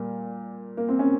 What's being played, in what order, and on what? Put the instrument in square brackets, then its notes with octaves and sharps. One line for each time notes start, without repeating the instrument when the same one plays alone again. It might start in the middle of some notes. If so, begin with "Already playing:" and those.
Already playing: [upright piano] A#2 G3 A#3
A#3
C4
C#4